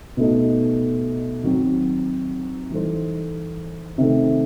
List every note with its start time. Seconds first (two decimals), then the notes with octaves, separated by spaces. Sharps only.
0.17 B2 A3 D#4
1.43 D#3 F#3 C4
2.70 E3 G3 D#4 A4 C5
3.98 C3 D#3 A3